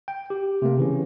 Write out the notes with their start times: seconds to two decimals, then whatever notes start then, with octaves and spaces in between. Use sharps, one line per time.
0.08 G5
0.30 G4
0.62 C3 A3 A#3
0.77 C#3 E3 C#4